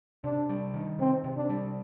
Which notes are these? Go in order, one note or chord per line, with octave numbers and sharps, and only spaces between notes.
C3 D4
G3
D#3
C3 C4
C3
D4
G3